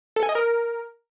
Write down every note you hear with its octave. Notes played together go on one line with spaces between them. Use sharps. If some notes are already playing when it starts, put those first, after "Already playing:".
A4
G#5
D#5
A#4